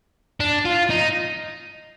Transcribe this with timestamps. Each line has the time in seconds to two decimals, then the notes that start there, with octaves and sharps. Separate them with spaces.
0.40 D4
0.65 F4
0.90 D#4